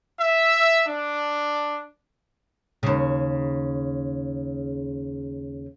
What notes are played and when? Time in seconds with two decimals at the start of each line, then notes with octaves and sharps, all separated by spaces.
0.20 E5
0.87 D4
2.83 D#2 C#3